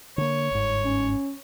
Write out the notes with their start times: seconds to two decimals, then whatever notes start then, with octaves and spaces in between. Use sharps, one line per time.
0.18 D3 A#3 C#5
0.51 G1 G#2
0.84 C#4